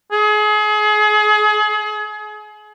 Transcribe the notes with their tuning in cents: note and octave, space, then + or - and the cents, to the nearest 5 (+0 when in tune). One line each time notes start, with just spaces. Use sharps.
G#4 +30